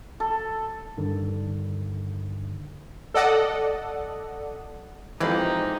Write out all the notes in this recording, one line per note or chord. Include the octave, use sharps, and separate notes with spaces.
A4
G2 D3 D#3
A4 D5 D#5 F#5
F2 E3 F3 G#3 D#4 G4